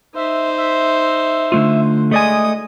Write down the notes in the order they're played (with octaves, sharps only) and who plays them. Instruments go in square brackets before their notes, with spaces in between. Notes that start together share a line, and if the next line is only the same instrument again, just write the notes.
[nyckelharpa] D#4 C5 [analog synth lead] E5
[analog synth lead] E5
[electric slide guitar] D3 A3 F4
[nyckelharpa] G#3 D#6 [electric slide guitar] A3 D5 G#5 [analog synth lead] D#5